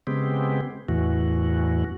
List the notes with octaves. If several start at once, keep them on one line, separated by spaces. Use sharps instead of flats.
C#3 G#3 B3 C4 G4
E2 A2 E3 F#4